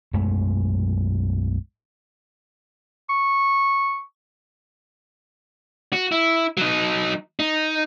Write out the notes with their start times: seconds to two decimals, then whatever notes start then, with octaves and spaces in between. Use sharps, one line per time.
0.13 B1 F#2 G#3 A3
3.09 C#6
5.93 F#4
6.12 E4
6.57 F#3 D#4
7.39 D#4